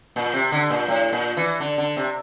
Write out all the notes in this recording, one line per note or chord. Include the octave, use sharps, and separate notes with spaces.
A#2
C3
D3
A#2
A2
A#2
E3
D3
D3
C3